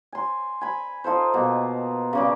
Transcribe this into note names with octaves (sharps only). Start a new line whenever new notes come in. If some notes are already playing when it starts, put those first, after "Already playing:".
G#5 C6
G#5 B5
D#4 F4 A4 C5
B2 A#3
C#3 A#3 D5